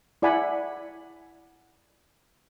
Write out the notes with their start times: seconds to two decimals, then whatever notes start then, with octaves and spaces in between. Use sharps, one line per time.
0.22 E4 D5 F#5 G#5 B5